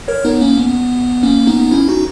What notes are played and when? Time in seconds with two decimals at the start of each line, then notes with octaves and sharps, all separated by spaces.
0.08 A#4 C#5
0.25 B3 D#4
0.41 A#3 C#4
0.58 B3
1.23 A#3 C#4
1.47 B3 D#4
1.71 C#4 E4
1.88 D#4 F#4